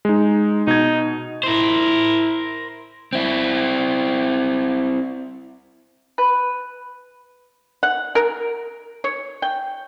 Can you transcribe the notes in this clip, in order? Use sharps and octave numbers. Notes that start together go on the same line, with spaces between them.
G#3 D#4
B2 D#4 G#6
E4 A#4 C5
C4 E4
B4
F#5
A#4
C#5
G5